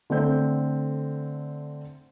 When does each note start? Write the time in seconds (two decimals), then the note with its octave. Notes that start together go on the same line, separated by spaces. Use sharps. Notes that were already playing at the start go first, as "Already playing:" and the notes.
0.10 D3 A3 C4 G6